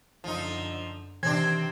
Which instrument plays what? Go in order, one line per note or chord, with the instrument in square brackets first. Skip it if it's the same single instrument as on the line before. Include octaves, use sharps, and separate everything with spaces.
[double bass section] F#2 D3 [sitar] F3 D#4
[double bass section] C3 D#3 [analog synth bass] E3 [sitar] C4 D4 [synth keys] G#6